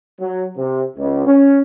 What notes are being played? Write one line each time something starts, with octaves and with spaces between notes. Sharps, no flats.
F#3
C3
C#2
C#4